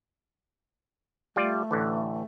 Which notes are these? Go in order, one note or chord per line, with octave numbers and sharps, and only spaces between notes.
G3 A3 F4 D5
A1 D3 E3